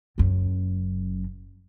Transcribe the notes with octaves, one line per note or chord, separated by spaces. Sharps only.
F#1 F#2